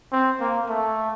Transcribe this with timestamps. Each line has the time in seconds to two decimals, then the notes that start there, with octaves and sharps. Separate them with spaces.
0.12 C4
0.40 A#3
0.69 A3